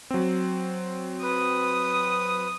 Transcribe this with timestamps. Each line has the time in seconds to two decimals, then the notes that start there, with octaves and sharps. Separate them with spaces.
0.11 F#3 C4
1.23 B4 D#6